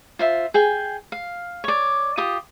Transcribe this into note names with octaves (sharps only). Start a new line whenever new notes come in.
F4 C5 E5
G#4 G5 G#5
F5
C#5 D5
F4 G4 D#6